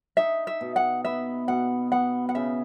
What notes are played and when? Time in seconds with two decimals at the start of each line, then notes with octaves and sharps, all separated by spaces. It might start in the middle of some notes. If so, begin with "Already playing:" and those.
0.17 D#4 E5
0.47 E5
0.61 B2
0.76 F#5
1.05 B3 E5
1.48 B2 F#5
1.92 B3 F#5
2.29 F#5
2.35 C#3 E5